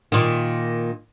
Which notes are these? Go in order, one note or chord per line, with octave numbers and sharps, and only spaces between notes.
A#2 D#3